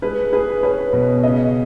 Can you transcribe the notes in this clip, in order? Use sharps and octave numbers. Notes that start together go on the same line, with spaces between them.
G#3 B4
G#4 B4
C#4 B4
B2
C#3 D#5